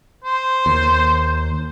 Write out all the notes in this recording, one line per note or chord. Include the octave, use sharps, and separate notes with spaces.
C5
D#2